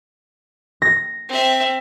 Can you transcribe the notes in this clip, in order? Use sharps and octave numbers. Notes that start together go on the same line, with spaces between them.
A#6
C4 E5